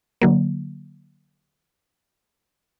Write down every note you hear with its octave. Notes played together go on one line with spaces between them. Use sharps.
D3 F#3 A#3